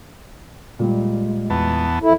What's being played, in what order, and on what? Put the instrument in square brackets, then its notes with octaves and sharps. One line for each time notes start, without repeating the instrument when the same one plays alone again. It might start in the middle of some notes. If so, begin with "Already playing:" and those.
[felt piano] A#2 G3 [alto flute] G#3
[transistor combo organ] E2 B3 A5
[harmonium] F2 E4 [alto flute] A4